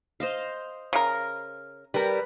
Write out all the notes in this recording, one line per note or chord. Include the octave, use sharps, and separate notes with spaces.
C5 D#5 F5
C#3 A#4
G3 G4 A#4 B4